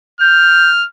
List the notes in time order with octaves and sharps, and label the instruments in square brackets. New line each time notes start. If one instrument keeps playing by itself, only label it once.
[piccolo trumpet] F6 [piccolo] G6